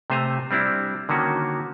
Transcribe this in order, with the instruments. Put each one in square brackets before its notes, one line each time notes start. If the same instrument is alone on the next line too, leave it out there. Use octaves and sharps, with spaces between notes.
[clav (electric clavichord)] C3 A3 C5 G#5 A#5
G3 C4 D4 E4
D3 D#3 A#3 C#4 F#4